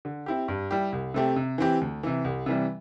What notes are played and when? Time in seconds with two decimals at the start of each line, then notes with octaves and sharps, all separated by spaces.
0.05 D3
0.26 C4 E4 G4
0.48 G2
0.71 G3 E4 G4
0.93 C2
1.14 C3 A3 C4 G4
1.36 C3
1.58 E3 C4 E4 G4
1.81 D2
2.03 C3 E3
2.25 C2
2.46 C3 E3 G3